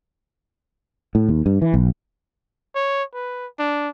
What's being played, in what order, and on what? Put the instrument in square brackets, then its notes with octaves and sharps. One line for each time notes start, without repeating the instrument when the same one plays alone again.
[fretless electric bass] A2
D#2
G2
E3
B1
[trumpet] C#5
B4
D4